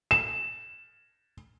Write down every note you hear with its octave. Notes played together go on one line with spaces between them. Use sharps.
E7